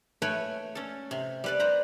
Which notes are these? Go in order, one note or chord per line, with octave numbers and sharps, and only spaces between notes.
A3 B4 C#5 G5 G#5
C#4 A4
C3
G3 B4 D5
B4 C5 A#5